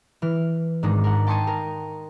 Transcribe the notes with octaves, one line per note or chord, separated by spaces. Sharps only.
E3 F6
G#2 D#3 G#3 D4 D#4
A#4 F#5
G5 A5 C6 C#6 D#6 G#6
A#4